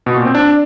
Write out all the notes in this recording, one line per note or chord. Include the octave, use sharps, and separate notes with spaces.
B2
A#2
C4
D4